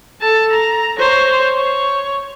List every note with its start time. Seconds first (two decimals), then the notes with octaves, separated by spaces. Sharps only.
0.21 A4 A5
0.52 A#5
0.98 C5 C#5
1.55 C#5